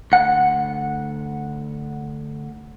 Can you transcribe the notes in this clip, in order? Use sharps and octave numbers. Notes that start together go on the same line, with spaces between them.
D2 F#5